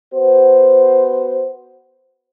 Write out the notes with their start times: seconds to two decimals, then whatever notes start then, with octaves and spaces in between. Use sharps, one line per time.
0.14 B3 F#4 C5